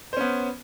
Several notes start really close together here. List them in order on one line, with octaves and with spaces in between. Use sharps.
C5 C#4 B3